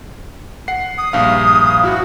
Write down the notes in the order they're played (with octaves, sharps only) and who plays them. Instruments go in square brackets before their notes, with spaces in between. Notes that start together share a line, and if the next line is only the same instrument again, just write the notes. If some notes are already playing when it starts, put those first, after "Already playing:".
[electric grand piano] F#5 C7
[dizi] D#6
[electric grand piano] A#1 G2 F5
[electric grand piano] E4 [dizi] F#4